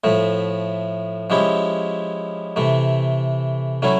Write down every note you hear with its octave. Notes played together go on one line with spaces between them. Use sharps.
A2 F3 A3
F3 G#3 C#4 E4 G4
C3 E3 A3
F#3 A3 C#4 E4